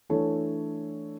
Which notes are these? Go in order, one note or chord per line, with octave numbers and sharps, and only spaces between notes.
E3 A3 D4 A4 C#5